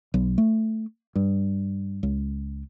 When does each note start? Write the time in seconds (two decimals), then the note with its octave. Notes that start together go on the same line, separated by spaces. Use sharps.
0.14 B1
0.38 A3
1.15 G2
2.03 C#2